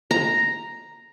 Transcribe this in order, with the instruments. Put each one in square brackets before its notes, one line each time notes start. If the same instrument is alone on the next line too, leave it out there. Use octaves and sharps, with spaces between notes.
[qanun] A#5